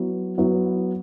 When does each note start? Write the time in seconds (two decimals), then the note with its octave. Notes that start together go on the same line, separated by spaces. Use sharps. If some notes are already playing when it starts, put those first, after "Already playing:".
Already playing: F#3 B3 E4
0.37 F#3 B3 E4